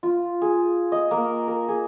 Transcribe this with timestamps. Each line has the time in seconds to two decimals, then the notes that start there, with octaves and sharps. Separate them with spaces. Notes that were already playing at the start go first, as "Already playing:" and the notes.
0.03 F4
0.42 G#4
0.92 D#5
1.11 A#3
1.48 A#4
1.68 G#4